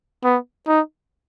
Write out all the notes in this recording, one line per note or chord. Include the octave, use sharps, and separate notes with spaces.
B3
D#4